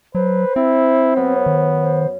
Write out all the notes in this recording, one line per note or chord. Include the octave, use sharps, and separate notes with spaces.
F#3 B4 C5
C4 E4
F#2 F#3 B3 E5
D#3
C5